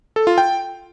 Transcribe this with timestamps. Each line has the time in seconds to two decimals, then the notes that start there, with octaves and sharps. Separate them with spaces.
0.16 A4
0.27 F4
0.38 G5